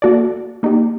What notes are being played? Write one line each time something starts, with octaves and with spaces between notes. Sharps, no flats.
A#3 F#4 A4 D5
A#3 D#4 G4 D5